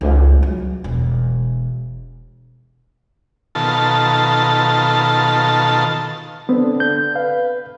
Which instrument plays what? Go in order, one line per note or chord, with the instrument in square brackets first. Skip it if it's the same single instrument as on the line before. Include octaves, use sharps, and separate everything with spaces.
[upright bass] C#2
F#3
E1
[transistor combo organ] B2 D#3 F4 A4 A5
[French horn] D3 [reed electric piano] B3 C4
[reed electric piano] G6
[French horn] B4 [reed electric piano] F5